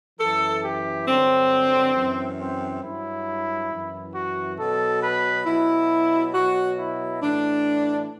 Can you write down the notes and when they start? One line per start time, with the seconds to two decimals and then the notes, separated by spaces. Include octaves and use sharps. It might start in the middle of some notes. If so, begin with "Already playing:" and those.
0.19 F#2 E3 A4
0.63 G4
1.07 G2 D3 F#3 C4
1.96 F#2 E3
2.39 C4
2.83 G2 F#3 E4
3.70 F#2 E3
4.14 F#4
4.58 B2 F#3 A4
5.02 B4
5.46 B2 F#3 E4
6.33 B2 F#3 F#4
6.78 E4
7.22 A2 E3 D4